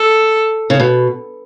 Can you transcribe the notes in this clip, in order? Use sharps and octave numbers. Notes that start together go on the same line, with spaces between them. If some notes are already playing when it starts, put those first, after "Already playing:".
Already playing: A4
C#3
B2